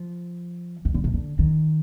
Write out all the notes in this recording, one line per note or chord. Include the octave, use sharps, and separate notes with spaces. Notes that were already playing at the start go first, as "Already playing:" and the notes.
Already playing: F3
D#3
D3
C3
D3
D#3